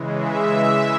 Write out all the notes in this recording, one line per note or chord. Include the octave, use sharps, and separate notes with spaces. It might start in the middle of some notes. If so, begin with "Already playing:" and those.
Already playing: C#3 E3 G#3
E5